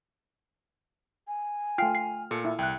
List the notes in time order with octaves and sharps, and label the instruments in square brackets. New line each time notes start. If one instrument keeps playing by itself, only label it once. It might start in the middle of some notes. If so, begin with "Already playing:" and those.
[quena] G#5
[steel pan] A3 F4 [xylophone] G5 C7 [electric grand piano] F6
[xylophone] C7
[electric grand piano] A#2 C#7 [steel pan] A4
[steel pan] E4
[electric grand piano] C2 [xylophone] G5 F#6